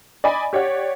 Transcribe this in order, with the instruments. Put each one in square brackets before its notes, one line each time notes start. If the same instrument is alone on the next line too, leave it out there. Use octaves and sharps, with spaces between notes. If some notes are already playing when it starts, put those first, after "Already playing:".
[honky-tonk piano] D5 D#5 G#5 B5
G4 C#5 D5 F#5